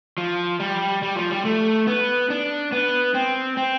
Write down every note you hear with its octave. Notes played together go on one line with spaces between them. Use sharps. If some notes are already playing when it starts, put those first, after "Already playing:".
F3
G3
G3
F3
G3
A3
B3
D4
B3
C4
C4